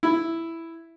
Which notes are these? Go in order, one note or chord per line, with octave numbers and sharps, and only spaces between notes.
E4